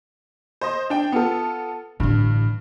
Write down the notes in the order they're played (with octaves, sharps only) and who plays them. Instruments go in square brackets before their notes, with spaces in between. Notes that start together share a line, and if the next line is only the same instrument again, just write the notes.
[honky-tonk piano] C5 D#5
D4 G5
B3 F4 A4
[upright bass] A1 D3 [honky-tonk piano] G2